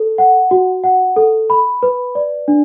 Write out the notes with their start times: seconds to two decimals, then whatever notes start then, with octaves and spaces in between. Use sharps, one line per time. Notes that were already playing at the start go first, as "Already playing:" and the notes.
Already playing: A4
0.18 F#5
0.51 F#4
0.84 F#5
1.16 A4
1.50 B5
1.83 B4
2.15 D5
2.48 D4